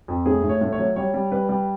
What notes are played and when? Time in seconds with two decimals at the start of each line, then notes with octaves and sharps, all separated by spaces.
0.08 F2
0.26 A2 G#4
0.43 A2
0.49 C#5
0.61 A2
0.72 C#5
0.79 F#3
0.96 G3 C#5
1.14 G3
1.32 G3 B4
1.49 G3